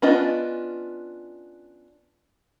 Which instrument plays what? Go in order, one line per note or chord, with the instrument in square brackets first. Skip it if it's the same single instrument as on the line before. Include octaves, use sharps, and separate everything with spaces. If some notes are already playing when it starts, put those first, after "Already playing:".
[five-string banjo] B3 C#4 D4 F4 D#5